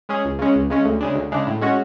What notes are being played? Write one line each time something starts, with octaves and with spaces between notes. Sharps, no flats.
G#3 C#4 G#4
C#2
C#3 G#3 C#4
C#2
C#3 G#3 C#4
D2
C#3 G#3 D4
D2
C#3 G#3 D4
A2
G#3 C#4 F#4